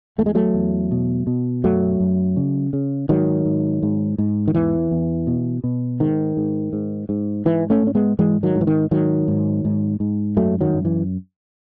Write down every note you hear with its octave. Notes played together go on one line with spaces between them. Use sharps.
E2 A3
G#3
F#3 A3
E2
B2
B2
F#2 F#3 A3
F#2
C#3
C#3
G#2 D#3 F#3
G#2
G#2
G#2
D#3
E2 E3
E2
B2
B2
G#2 D#3
G#2
G#2
G#2
G#2 E3
A3 C#4
G#2 C#4
G#3 B3
G#2 E3 G#3
D#3 F#3
G#2
E3
D#3
G#2 D#3 F#3
G#2
G#2
G#2
F#2 F#3 A3
D#3 F#3
F#2
E3